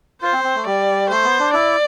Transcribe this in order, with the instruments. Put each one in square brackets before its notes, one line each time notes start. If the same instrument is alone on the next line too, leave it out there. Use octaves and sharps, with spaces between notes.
[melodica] F4 [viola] C5
[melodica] C4
C4
A3
[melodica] G3 [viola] D5
[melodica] A3 [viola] C5
[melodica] B3
D4
[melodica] E4 [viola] D5